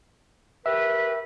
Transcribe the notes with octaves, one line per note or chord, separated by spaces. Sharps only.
G4 A#4 B4 E5